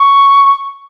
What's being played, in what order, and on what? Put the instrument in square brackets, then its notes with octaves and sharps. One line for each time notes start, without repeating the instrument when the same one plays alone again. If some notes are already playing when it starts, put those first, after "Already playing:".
Already playing: [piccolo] C#6